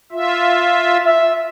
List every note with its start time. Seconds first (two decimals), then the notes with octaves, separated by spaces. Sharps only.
0.12 F4 E5
1.05 E5